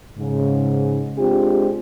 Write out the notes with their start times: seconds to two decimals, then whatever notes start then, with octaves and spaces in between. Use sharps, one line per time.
0.18 G#2 C#3
1.18 G#3 C4 D4 F4 G4